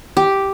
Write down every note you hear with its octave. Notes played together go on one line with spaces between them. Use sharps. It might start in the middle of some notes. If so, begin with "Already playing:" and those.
G4